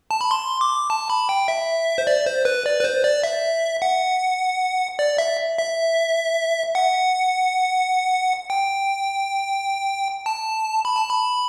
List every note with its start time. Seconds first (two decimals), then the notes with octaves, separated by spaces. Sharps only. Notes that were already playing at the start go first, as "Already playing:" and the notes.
0.11 A5
0.21 B5
0.31 C6
0.61 D6
0.90 A5
1.10 B5
1.29 G5
1.48 E5
1.98 C5
2.07 D5
2.26 C5
2.45 B4
2.66 D5
2.80 B4
2.84 C5
3.04 D5
3.23 E5
3.82 F#5
4.99 D5
5.18 E5
5.58 E5
6.75 F#5
8.50 G5
10.26 A5
10.85 B5
10.97 A5
11.10 B5